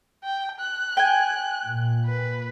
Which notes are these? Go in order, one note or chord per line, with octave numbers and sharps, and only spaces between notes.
G5
F#6
G5 G#5
A#2
B4